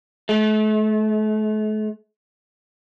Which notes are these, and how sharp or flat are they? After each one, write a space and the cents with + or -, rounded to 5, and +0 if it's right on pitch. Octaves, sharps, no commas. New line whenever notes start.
A3 -40